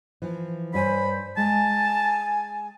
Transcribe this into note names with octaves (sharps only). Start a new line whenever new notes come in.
E3 F3
G2 C5 C#5 G#5 B5
G#3 G#5 A5